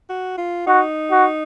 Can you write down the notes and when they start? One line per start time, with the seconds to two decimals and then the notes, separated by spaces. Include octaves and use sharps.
0.10 F#4
0.38 F4
0.67 D#4 F#4
1.12 F#4